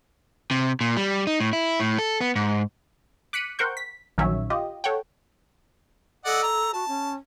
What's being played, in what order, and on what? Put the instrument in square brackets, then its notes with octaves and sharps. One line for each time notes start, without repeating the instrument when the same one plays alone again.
[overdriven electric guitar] C3
A#2
G3
D#4
A2
E4
A2
A4
B3
G#2
[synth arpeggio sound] D6 F#6 B6 C#7 D#7
A#4 C5 F#5 G5 C#6 G6
B6
A#1 D#3 F#3 C#4 C#5 E5
F4 G4 D#5
A4 C#5 F#5 G5
[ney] A4 [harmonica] D5 D#5 F#5
[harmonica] A#5
[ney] F#4 [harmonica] A5
[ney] C#4